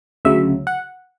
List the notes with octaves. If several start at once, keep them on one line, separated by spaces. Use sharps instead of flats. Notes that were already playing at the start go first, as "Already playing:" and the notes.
D2 C#3 F#3 E5
F#5